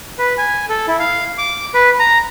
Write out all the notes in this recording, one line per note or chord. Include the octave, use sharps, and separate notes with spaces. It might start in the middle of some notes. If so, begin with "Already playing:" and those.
B4
G#5
A4
E4
F5
D6
B4
A#5